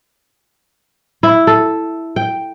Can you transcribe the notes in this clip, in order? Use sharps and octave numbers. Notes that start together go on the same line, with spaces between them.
E4
A4
G5